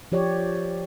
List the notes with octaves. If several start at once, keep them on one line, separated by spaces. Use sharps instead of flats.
F3 G4 C#5 D5